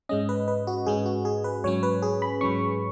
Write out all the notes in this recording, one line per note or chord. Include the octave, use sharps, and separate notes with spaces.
G#2 G#3 C#4 D#5
B4
B4
F#4
G#2 G#3 C#4 G#4
F#4
G#4
B4
G#2 F#3 C#4 C#5
B4
G#4
B5
G#2 F#3 C#4 C#6